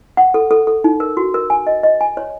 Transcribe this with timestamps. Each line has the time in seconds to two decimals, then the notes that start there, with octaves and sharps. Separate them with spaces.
0.17 F#5
0.34 A4
0.51 A4
0.67 A4
0.84 D#4
1.00 A#4
1.17 F#4
1.34 A#4
1.50 G#5
1.67 D#5
1.83 D#5
2.01 G#5
2.17 C#5